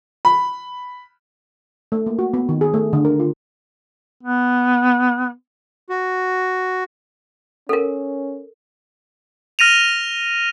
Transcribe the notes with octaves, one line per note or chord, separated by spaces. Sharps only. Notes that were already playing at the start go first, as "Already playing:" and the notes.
B5
A3
A#3
F#4
B3
D#3
G#4
A3
D3
A#4
F4
B3
F#4
C#4 A4 A#4
F6 A#6 D#7 F7